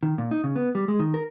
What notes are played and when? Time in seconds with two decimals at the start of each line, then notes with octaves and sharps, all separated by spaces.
0.03 D#3
0.18 A#2
0.31 D#4
0.44 C#3
0.56 B3
0.75 G3
0.88 G#3
0.99 D#3
1.14 A#4